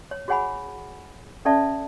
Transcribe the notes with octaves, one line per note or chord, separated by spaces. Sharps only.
C#5
F#4 G#4 C#5 F#5 G#5 B5
C#4 A4 D5 E5 A5